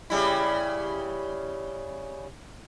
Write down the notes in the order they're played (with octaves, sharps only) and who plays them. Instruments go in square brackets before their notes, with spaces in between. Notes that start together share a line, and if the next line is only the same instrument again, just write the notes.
[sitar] C#3 G3 E4